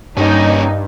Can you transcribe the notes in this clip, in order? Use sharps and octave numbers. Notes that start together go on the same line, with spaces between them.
G2 A#3 C#4 D#4